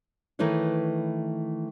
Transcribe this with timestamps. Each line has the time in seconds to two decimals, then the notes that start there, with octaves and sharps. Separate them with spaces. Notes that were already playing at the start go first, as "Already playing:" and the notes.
0.39 D#3 E3 A3 E4 B4 C#5